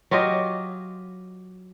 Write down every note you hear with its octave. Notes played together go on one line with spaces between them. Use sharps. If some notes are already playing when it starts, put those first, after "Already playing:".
F#3 F4 G4 D#5